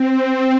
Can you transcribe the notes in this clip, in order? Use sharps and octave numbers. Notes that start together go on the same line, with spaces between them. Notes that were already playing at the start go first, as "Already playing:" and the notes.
Already playing: C4